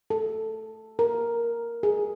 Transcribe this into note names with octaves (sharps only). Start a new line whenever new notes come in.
A4
A#4
G#4